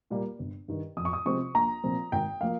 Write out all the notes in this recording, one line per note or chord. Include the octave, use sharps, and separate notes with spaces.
A#2 G3 A#3
G1
G2 D#3
F2 D#6
C#6
D#6
C3 F3 G#3 C4 C#6
A#1 A#5
A#2 F3 C4
G#1 G5
F3 A#3 F5